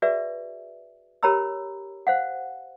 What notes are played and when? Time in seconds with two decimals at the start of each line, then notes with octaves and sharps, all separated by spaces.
0.02 F#4 G#4 B4 D5 E5
1.23 G4 A#4 C#5 A#5 B5 E6
2.07 C5 F5 F#5